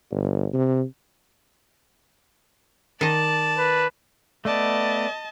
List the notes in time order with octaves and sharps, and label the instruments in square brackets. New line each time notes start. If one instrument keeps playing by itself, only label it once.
[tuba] G1
C3
[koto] D#3 D#5 [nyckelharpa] D5 A5
[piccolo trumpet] B4
[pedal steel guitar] A3 B3 [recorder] D5 [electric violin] D#5 A5